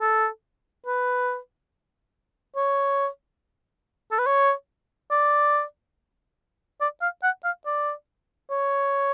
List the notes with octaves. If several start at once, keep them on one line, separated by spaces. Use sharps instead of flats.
A4
B4
C#5
A4
B4
C#5
D5
D5
F5
F#5
F5
D5
C#5